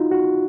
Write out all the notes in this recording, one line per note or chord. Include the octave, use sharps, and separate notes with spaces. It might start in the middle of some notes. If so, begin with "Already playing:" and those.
Already playing: D#4 F4 F#4
F#4